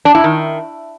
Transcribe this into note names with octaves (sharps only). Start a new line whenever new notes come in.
D4
E4
D#3